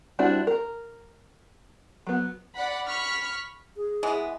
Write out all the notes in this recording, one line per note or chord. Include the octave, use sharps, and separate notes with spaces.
G3 C4 D4 E4 F#4
A#4
F#3 B3
D5 F#5 B5
B5 C#6 F6 B6
G#4
E3 G#3 B3